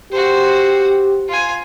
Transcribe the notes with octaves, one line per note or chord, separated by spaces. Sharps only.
F#4 G4 C5
F4 G#5